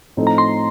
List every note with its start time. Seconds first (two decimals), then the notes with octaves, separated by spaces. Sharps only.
0.17 A2 F3 C4 D#4 A4
0.27 A#5
0.38 C6